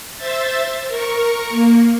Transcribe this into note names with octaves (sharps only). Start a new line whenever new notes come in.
C5 E5 A6
A#4 C#6
A#3